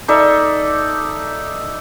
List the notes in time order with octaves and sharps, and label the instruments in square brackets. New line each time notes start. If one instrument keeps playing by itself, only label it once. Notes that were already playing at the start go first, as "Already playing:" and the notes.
[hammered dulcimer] D#4 A4 D5 E5